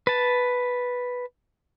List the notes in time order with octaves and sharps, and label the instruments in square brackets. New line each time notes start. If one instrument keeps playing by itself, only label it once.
[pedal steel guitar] B4 A5